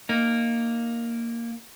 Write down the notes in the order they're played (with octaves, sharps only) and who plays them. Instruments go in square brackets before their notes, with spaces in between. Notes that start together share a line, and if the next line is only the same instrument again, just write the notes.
[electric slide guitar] A#3 D#4